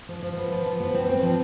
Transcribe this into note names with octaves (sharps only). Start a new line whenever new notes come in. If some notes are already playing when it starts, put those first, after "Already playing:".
F3
F3
B3
F3
F3
B3
C4
C4
F3